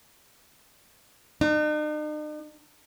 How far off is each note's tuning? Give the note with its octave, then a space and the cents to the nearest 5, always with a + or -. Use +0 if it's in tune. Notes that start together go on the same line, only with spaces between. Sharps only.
D#4 -45